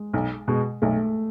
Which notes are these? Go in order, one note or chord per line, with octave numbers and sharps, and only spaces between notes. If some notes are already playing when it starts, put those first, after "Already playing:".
Already playing: G#3
B1
B2 G#3
B1 A3